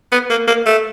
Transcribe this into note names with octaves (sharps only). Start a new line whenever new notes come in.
B3
A#3
A#3
A3